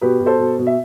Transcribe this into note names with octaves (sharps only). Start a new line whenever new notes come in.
B2 G4 B4
B2
A4 C5
B2
B2
E5